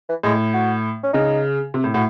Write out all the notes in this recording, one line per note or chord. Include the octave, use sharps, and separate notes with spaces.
E3
A2 G#3
F#4
C#4
C#3 D#4
C3
A2
A2 F#4